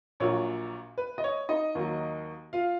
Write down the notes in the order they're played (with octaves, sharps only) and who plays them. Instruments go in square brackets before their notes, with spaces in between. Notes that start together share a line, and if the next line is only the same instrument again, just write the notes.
[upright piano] A#1 A#2 F#3 C#5
B4
D#5
C#5
D#4 D#5
D#2 D#3 F#3
F4 F5